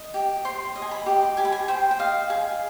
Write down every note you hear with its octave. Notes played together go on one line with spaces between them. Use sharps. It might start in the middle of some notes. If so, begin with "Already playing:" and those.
Already playing: D#5
G4
C5 C6
D#5
G#5
B5
G4
G4 G#5
B5
G#5
C5 G5
G5
D#5 F5
G#4